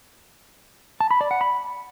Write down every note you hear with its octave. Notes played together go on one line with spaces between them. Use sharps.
A5
B5
D5
F#5
B5